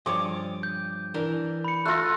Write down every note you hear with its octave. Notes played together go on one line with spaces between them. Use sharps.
G2 F3 C#5 D6 D#6
G6
E3 D4 A#4
B5 C#7
A3 F4 F#6 A#6